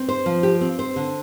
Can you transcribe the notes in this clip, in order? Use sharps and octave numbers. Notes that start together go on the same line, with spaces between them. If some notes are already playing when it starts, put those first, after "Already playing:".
Already playing: C4
C5
F3
G4
C4
C5
D3